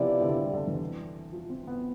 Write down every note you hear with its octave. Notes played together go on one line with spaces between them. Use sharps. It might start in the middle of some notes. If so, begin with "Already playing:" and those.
Already playing: C3 F3 B3 E4 G4 D5
D3
C3
G3
D3
E3
F3
C4
B3